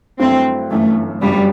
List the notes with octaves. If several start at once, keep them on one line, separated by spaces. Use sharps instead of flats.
G2 F#3 A3 C4 E4
G1 F#2 E3 A3
G1 F#2 D3 F#3 G3